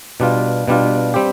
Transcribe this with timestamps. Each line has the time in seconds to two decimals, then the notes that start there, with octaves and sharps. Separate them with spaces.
0.20 B2 G3 D4 F4
0.68 B2 G3 D4 F4
1.14 G3 C4 G4